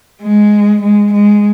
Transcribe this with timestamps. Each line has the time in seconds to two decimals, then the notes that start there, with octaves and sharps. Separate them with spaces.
0.22 G#3
0.82 G#3
1.13 G#3